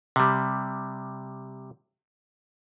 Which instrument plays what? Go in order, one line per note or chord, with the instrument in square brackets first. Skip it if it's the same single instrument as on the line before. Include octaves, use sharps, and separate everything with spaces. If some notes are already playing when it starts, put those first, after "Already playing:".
[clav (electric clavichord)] C3 G3